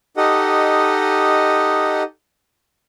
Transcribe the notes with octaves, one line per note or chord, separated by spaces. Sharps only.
D#4 G4 A4 D#5 F#5